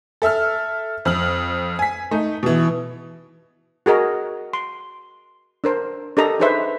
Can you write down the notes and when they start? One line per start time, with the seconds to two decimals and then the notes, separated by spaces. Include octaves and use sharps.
0.22 A4 E5 E6 F6
1.05 F2 F6 F#7
1.79 G#5 B6
2.11 A3 D#4
2.43 B2 E3
3.86 F#4 G#4 A#4 D#5
4.53 C6
5.64 D4 A#4 C5
6.17 D4 G4 A4 A#4 D#5 A#5
6.40 D4 D#4 G#4 B4 C5 E5